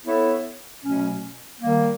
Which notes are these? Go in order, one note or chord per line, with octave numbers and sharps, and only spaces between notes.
B3 E4 A4 C#5 E5
B2 F#3 A3 C#4
D#3 G3 A#3